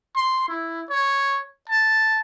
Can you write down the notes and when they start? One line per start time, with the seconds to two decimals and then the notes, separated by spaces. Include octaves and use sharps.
0.16 C6
0.49 E4
0.90 C#5
1.69 A5